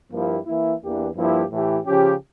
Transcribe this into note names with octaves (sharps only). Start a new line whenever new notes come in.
G2 F3 A#3 E4 G4
E3 A#3 E4
E2 E3 A#3 D4 G4
G2 F3 A#3 E4 G4
A2 E3 A3 E4 G4
C#3 F3 C#4 G4